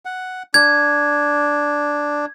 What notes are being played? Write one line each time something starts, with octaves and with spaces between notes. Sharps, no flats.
F#5
D4 G#6